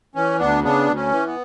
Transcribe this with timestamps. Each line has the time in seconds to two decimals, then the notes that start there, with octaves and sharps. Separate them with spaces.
0.15 E3 C#4
0.39 D2 B3 D4
0.63 C#3 B3 D4
0.87 D2
0.95 C#4
1.11 E3
1.27 B3